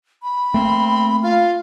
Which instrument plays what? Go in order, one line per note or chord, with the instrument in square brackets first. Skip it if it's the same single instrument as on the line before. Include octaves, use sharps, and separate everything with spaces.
[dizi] B5
[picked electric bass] A3 A#3 [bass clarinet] C4
[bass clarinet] F4 [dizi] F5